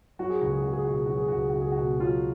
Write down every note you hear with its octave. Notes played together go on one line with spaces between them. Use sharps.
F#3 F#4
G#4
C#2 F#4
G#4
C#2 F#4
G#4
B2 F#4
G#4
F#3 F#4
G#4
C#2 F#4
G#4
F#4
C#2
G#4
F#4
B2
F#3 F4